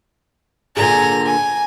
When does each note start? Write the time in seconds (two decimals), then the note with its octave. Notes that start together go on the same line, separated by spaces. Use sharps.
0.77 A#2 D3 G#4 G#5 A#5
1.26 G#5